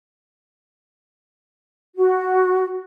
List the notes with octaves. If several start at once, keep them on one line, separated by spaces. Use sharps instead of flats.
F#4